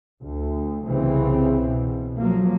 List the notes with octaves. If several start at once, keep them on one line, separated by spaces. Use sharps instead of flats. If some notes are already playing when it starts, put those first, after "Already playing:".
D2
C2 C#3 E3 C4
B2
F3 F#3 A#3